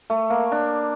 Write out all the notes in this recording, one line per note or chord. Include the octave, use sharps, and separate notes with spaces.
A3
A#3
D4